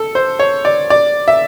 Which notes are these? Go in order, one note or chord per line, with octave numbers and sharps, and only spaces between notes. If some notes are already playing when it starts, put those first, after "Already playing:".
Already playing: A4
C5
C#5
D5
D5
E5